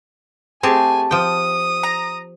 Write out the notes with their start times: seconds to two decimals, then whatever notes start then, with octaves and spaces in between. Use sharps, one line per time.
0.63 A3 C4 G4 G#4 G#5 A5
1.11 F3 G5 D#6
1.83 A#5